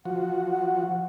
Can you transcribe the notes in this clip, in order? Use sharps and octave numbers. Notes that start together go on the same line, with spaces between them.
F3 F#4 F#5